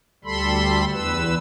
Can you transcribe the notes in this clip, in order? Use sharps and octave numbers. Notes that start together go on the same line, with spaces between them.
D2 G3 A4 B5 C6
E2 B4 E6